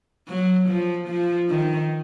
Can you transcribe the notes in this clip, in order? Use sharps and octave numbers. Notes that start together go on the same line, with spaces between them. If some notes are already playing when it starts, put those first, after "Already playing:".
F#3
F3
F3
D#3